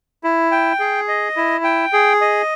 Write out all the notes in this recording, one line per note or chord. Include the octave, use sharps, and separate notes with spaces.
E4
G5
G#4
D#5
E4
G5
G#4
D#5